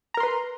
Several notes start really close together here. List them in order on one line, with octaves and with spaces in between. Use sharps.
A#5 A#4 C6 B4